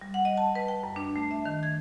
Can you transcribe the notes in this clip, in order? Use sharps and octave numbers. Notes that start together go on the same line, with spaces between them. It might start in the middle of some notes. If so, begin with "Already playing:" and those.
G3
F#5
D#5
A5
B4
G5
F#2
D4
A3
E5
D#3
G#6